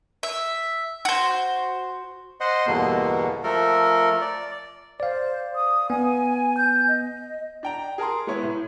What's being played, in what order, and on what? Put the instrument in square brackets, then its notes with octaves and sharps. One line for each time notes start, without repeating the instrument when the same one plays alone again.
[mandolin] E5
F#4 C5
[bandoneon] C5 D#5 F#5 C6
E2 G2 B2 D3 A#3 B3
F3 A3 A4 A#4
D5
[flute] C5 [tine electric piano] D5 F5
[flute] D#6
[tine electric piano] B3 [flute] G#5
[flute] G6
D#5
[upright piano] D4 G5 A#5
G#4 A#4 A5 A#5 C6
G#3 B3 E4 C#5
A2